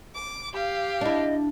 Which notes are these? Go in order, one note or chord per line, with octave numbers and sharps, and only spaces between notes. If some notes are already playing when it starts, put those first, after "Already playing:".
D6
G4 F5
D4 E4 D#5